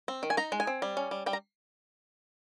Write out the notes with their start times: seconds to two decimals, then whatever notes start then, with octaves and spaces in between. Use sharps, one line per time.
0.08 C4
0.23 D#3
0.30 G#5
0.37 D#4 A#5
0.52 G#3
0.60 G#5
0.67 C4
0.82 G3
0.97 C#4
1.11 G3
1.26 G3 G5
1.33 A#5